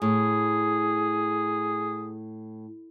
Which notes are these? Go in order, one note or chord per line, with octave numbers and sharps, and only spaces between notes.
A2 G#4